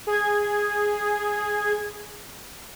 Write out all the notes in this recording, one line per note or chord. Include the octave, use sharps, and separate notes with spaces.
G#4 G#6